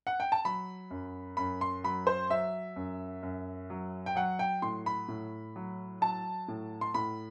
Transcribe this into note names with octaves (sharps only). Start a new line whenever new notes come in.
F#5
G5
A5
F#3 B5
F#2
F#2 B5
C6
F#3 B5
C5
F#3 E5
F#2
F#2
F#3
G5
F#3 F#5
G5
A2 C6
B5
A2
F#3
F#3 A5
A2
C6
A2 B5